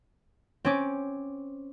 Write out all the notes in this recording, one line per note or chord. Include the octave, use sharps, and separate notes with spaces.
C4 C#4 D6